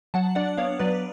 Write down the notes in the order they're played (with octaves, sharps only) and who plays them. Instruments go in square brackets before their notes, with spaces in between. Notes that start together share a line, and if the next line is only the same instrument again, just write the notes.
[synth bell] F#3 F#5 A5
D4 D5 F#5
B3 C#5 F5
F#3 B4 D5